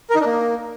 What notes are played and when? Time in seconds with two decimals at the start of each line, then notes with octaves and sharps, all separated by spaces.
0.10 A#4
0.15 D#4
0.20 D4
0.26 A#3